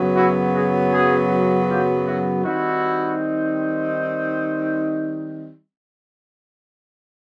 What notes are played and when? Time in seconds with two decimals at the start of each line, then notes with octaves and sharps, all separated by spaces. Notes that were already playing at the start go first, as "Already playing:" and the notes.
Already playing: F#2 C#3 F#3 B3
0.15 E4 F#4
0.53 F#4 G#4
0.92 F#4 G#4
1.68 F4 G4
2.06 E4 F#4
2.45 D#3 G3 C4 D#4 E4 F#4